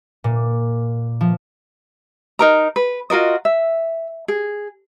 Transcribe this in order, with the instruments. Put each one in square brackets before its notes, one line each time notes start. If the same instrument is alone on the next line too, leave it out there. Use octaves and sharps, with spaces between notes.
[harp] A#2
F3
[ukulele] D#4 A#4 A#5
B4
F4 F#4 A#4 D#5
E5
G#4